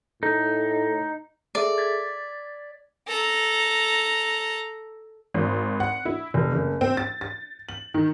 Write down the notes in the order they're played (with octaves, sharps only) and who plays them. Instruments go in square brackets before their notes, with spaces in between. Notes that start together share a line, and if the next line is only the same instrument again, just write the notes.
[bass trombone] A2 [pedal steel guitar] D#4 [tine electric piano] A4
[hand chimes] G#4 A4 E5 [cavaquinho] D5
[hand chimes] G#6 A6 B6
[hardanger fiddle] A4 A#5
[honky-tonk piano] G#1
F#5
E4
F1
F#1
C4
A6
A6
F#7
D#3